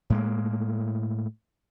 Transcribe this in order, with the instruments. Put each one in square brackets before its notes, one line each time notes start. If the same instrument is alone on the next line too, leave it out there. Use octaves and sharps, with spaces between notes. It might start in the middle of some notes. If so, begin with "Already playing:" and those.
[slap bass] A2 G#3 A#3